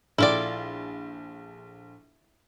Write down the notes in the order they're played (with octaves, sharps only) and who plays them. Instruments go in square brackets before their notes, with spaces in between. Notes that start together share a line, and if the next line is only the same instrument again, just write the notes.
[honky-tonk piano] A#1 A4 G5 [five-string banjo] E4 F4 D5